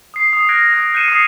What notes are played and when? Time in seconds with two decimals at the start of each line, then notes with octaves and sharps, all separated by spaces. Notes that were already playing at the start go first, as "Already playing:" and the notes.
0.14 D#6 C7
0.33 D#6 C7
0.49 F6 F#6 G#6 A#6 D7
0.73 D#6 F#6 A#6
0.94 F#6 G6 A#6 C#7 D#7 E7
1.08 D#6 C7 C#7 E7